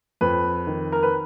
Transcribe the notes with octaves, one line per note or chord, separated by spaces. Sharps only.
F2 B4
D#3
A#4
B4